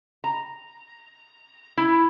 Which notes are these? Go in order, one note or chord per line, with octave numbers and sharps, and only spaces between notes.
A#5
E4